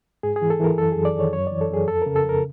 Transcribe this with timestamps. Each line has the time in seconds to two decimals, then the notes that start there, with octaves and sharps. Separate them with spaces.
0.23 G#2 G#4
0.36 G#4
0.42 E3
0.50 A4
0.60 E3 A#4
0.78 F#2 A4
0.92 F#2 G#4
1.05 D5
1.15 D#3 C#5
1.33 F#2 C#5
1.47 E3 D5
1.61 A4
1.70 F#2 G#4
1.87 F2 A4
2.02 C#3 A#4
2.16 A4
2.24 F2
2.29 A#4